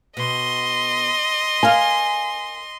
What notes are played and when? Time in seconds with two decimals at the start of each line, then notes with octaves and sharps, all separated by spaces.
0.17 B2 D#5 C6
1.63 A#4 F5 G#5